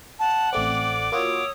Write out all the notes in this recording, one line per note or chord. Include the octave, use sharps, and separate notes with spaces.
F#5 A5
A1 A3 C4 D5 D6
A#3 F4 F#4 C#5 D#6 E6